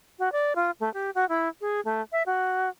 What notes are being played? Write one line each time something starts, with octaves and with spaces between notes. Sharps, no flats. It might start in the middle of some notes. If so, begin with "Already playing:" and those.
F#4
D5
F4
A3
G4
F#4
E4
G#4
A3
E5
F#4